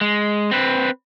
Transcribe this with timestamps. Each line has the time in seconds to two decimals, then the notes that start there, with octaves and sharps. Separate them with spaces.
0.01 G#3
0.51 C4 B4